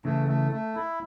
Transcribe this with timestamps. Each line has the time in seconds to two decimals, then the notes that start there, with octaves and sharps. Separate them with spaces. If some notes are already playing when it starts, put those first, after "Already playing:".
0.05 C#3 E3 A3
0.27 A3
0.52 A3
0.75 E4